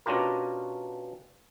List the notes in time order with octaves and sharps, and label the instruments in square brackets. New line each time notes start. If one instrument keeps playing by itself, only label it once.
[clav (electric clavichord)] B2 C#4 D4 F4 G4 A#4